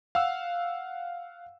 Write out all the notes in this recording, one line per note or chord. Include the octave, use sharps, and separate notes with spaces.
F5 F#5 E6